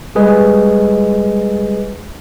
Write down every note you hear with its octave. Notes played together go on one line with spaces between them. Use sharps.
G3 G#3 G#4 B4 D#5